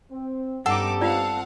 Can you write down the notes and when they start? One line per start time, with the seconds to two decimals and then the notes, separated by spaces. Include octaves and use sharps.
0.11 C4
0.66 G2 B3 C#4 D#4 G4 A4 F#5 D6
1.01 C4 F4 D5 F5 F#5